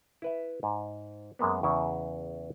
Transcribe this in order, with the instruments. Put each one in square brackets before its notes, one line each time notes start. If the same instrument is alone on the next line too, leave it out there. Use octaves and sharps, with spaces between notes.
[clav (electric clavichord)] E4 B4 E5
G#2
F#2 G#3 A#3 B3
E2 C#3 E4 E5